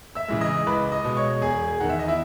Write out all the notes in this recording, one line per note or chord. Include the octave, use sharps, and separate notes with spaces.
E5 E6
C#3 E3 G#3
D#5 D#6
C#2 B4 B5
D#5 D#6
B2 G#3
C#5 C#6
E1 G#4 G#5
E2 D#3 F#5
E5
D#5
E4 E5